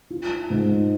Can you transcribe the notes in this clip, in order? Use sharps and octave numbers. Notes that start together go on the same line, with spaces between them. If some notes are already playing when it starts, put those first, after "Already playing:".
F4
G#2